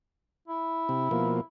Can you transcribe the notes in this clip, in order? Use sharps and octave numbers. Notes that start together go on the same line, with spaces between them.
E4
C3
B2 F3 A#3